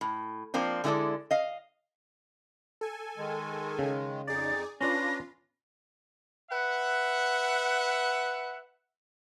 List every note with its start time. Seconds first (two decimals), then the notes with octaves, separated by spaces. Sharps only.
0.01 A2
0.54 F3 A#3 C4 D4
0.84 D3 G#3 E4 F#4 A4 D5
1.31 D#5 F5
2.81 A4 G#5
3.18 D#3 G#3
3.79 C#3
4.27 F2 D#4 G#4 D5 A6
4.81 C#4 D4 F4 B4 D5 B5 C6 A#6
6.51 B4 E5 F#5